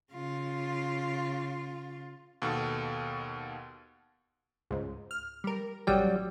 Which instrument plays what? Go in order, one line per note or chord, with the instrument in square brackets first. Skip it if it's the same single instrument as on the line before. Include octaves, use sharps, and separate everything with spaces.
[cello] C#3 F4
[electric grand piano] D#2 B2 A4
[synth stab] C#2 G#2
F6
G3 A#4
[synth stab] A1 G5 [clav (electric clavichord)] F#3 G3